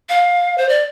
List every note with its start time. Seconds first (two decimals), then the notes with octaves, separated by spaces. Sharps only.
0.09 F5
0.58 C5
0.69 D5